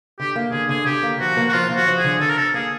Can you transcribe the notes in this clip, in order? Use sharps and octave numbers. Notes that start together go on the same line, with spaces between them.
D3 G4
A#3
D3 G#4
D3 G#4
D3 G4
A#3
F3 F#4
A#3
F#4
F3 F4
F3
F#4
F3
G#4
D3
D3 A4
A#4
D3 A4
A#3 G#4